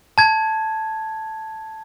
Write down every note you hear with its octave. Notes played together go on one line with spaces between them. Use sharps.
A5 G#6